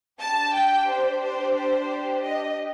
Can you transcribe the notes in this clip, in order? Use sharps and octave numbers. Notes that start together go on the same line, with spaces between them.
D4 G4 A5
G5
C5
C5
C5
D#5